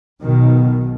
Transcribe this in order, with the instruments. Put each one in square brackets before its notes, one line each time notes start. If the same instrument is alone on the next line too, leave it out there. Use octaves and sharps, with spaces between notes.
[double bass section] B1 B2 D#3